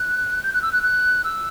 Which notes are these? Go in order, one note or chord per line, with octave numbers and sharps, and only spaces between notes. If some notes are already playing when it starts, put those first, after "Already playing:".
Already playing: F#6
G6
F#6
E6
F#6
F#6
E6